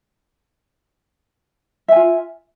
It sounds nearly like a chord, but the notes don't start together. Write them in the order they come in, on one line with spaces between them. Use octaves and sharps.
E5 G#5 F4